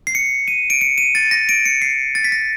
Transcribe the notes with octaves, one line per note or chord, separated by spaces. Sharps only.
C7
C#7
D#7
D7
C#7
D#7
A6
A#6
D7
C#7
C7
A6
B6
A#6